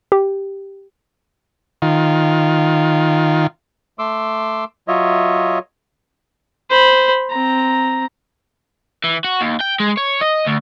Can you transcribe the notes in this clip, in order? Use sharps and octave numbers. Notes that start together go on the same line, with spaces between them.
G4
D#3 F4
A3 C6 D6 E6
F#3 F4 C#5 D#5 E5
C5 B5
C4 A#5
E3
F#4
D#2
G5
G#3
C#5
D#5
D2